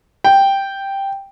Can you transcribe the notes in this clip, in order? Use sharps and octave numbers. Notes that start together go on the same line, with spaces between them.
G5